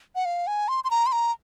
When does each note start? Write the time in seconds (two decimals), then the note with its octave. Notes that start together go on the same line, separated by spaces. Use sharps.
0.15 F#5
0.25 F5
0.47 G#5
0.68 C6
0.84 C6
0.91 A#5
1.06 C6
1.12 A#5